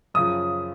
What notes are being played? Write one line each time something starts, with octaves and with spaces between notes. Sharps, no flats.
F#2 C#3 F3 D#6